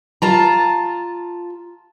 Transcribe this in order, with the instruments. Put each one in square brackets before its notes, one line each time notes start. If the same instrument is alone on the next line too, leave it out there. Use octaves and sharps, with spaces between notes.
[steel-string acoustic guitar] F4 A5 A#5